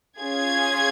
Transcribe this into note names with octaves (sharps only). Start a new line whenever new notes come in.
C#4 F4 G#4 G#6